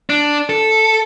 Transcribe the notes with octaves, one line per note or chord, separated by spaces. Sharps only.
D4
A4